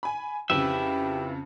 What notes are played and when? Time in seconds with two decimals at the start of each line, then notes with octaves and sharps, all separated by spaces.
0.03 G#5 B5
0.50 F2 C#3 E4 G4 B4 E5